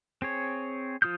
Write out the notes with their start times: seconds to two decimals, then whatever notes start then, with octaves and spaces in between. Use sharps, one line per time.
0.22 C4 G#4 C#5
1.02 F3 F4 D#6 F6 G6